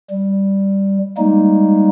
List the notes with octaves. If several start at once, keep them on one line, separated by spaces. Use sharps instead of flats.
G3
G3 G#3 A#3 D#4